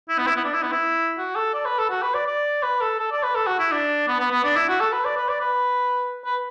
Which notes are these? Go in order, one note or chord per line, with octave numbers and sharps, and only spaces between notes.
E4
B3
E4
B3
D4
E4
B3
E4
F#4
A4
D5
B4
A4
F#4
B4
D5
D5
B4
A4
A4
D5
B4
A4
F#4
E4
D4
B3
B3
B3
D4
E4
F#4
A4
B4
D5
B4
D5
B4
B4